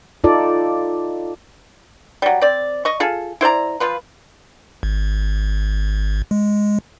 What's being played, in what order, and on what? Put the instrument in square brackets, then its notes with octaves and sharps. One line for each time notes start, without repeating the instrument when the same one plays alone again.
[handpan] D#4 F4 A4 D5
[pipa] F#3 G3
C4 D5
D#5 C#6
F4 G#4 A4
E4 C5 D5 A#5
F3 F4 B4
[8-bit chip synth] G#1
G#3